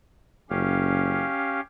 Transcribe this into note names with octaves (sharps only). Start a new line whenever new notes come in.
F#1 C#4 G4 F5